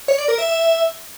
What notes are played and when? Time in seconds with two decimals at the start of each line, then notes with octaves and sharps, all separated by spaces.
0.08 C#5
0.18 D5
0.28 A#4
0.38 E5
0.48 E5